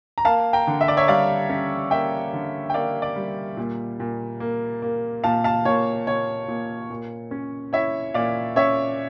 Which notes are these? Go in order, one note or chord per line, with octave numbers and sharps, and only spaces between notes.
A#5
A#3 F5 A5
G5 A#5
D3
E5
D5
C#5 E5
G3 D5 F5
C#4
A#3 E5 G5
D3
G5
A#3 D5 F5
D5
G3
A#2
A#2
A#3
A#3
A#2 F5 A5
F5 A5
A#2 C#5
A#2 C#5
A#2
A#2
C#4
E4 C#5 E5
A#2 D5 F5
C#4 C#5 E5